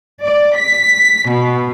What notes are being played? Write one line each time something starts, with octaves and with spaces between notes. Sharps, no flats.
D5
B6
B2